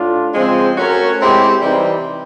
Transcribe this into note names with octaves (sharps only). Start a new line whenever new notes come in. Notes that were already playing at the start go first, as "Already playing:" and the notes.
Already playing: A2 D4 F4
C#3 F3 G#3 C4
A3 C#4 F#4 A#4 C#5
G#3 C4 E4 G4
C3 E3 G3 C4 D#4